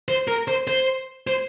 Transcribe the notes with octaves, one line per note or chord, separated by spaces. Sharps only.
C5
A#4
C5
C5
C5